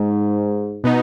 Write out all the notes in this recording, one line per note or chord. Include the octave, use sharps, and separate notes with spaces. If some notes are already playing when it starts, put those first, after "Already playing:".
Already playing: G#2
B2 B3 D#4